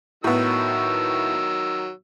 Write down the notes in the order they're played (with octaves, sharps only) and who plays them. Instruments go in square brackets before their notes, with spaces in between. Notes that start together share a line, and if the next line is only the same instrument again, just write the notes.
[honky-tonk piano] A2 B3 [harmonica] D#3 F#3 E6